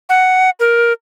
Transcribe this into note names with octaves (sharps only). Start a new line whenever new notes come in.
F#5
A#4